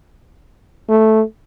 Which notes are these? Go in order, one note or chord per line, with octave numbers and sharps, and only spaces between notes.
A3